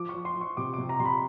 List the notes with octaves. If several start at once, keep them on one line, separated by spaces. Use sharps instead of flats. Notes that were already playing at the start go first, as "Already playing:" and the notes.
Already playing: F3 D6
C#6
F3
C6
F3
C#6
C3 D6
C3 D6
A#5
C3 C6
B5